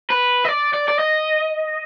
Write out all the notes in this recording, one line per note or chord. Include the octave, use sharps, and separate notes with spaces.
B4
D#5
D5
D5
D5
D#5